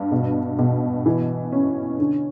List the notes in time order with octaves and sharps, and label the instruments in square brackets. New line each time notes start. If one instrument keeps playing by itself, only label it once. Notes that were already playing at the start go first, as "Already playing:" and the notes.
Already playing: [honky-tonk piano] G2
B2
B2
E3
C#4
D3